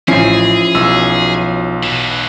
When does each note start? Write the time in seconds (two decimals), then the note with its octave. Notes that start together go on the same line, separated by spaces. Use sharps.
0.08 A1 F3 C#4 E4 G#4 C7
0.75 B1 E6
1.83 B2 E3